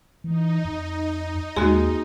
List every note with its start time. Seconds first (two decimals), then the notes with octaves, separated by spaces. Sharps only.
0.24 E3 D#4
0.65 F2
1.56 D#2 D#3 G#3 A#3 F#4 G#4